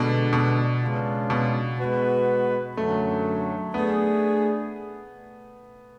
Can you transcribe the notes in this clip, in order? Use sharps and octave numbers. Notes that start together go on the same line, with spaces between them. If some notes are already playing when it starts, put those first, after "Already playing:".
Already playing: B2 D3 G#3 B3 D4
B2
C#3 G#3 B3 D4 F4
B2
G#3 B3 F#4 B4
F#2 D3 F#3 A3
A3 B3 D4 G#4